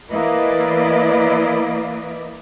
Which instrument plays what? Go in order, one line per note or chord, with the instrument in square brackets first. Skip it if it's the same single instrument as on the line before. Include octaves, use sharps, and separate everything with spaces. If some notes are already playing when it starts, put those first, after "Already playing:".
[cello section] E3 A#3 E4 B4 D5 D#5